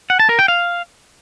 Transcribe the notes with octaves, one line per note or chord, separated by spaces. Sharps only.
F#5
A5
A#4
G5
F5